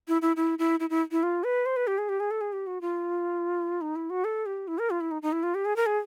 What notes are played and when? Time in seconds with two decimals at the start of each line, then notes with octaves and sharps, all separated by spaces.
0.08 E4
0.22 E4
0.36 E4
0.59 E4
0.80 E4
0.90 E4
1.11 E4
1.23 F4
1.44 B4
1.66 C5
1.76 B4
1.87 G4
1.98 G#4
2.09 G4
2.20 G#4
2.31 A4
2.41 G#4
2.53 G4
2.67 F#4
2.81 F4
3.81 D#4
3.96 E4
4.10 F#4
4.24 A4
4.46 G4
4.68 E4
4.79 A#4
4.90 F4
5.01 E4
5.11 D#4
5.22 D#4
5.32 E4
5.43 F4
5.55 G4
5.65 G#4
5.76 A#4
5.86 G#4